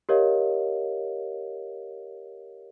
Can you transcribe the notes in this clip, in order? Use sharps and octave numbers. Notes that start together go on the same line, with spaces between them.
G4 A#4 C#5 D#5 F5